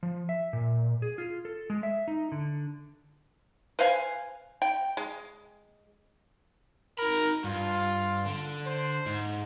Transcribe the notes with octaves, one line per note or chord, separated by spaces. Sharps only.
F3
E5
A#2
G#4
F4
A4
G#3
E5
D#4
D3
B4 C5 F5 G#5
G5
G#3
D#4 A#4 B5
G2 F4
D3
C5
G#2